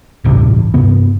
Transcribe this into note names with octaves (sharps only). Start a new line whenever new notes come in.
D1 A1 G2 C3
G2 C3 B3